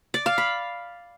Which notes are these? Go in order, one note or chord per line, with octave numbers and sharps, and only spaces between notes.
D5
F5
B5